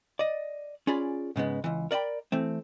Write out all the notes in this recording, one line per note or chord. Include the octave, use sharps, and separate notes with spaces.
D5 D#5
C#4 F4 G#4 D5 B5
G#2 C#3 G#3 B3
C#2 E3
A#4 D5 D#5 G5 B5
E3 A3 C4